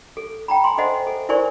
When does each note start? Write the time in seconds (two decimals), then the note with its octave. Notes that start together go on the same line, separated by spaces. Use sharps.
0.17 A4
0.48 G5 A#5 B5
0.64 G#5 C6
0.78 A4 C5 D#5 E5 F#5
1.07 A4
1.29 E4 A#4 C5 D5 G#5 C#6